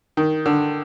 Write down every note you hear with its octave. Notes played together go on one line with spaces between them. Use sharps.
D#3
D3